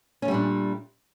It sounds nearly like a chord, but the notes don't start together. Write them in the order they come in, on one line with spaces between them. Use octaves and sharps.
C#4 A3 G3 A#2 D4